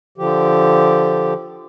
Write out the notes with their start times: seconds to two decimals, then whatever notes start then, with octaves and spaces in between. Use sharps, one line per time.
0.18 D3 F3 G4